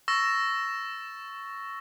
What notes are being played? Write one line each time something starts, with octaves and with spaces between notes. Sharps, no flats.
C#6 E6 A6 A#6 E7